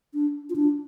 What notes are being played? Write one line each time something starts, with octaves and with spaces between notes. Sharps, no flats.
D4
F4
D4